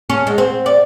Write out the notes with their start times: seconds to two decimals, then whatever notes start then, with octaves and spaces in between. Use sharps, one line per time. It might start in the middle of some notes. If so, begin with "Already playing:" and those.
0.10 C#4
0.27 G#3
0.38 C4
0.66 D5